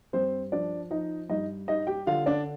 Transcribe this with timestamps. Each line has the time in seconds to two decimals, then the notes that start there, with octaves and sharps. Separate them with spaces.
0.13 G2 C4 C5
0.52 F3 D4 D5
0.90 F3 D#4 D#5
1.29 G2 D#4 D#5
1.68 G3 D#4 D#5
1.87 G4 G5
2.07 D3 F4 F5
2.26 D4 D5